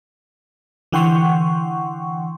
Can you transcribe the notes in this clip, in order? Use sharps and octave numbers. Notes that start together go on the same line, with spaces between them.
D3 E3 F#5 G5 C6 C#6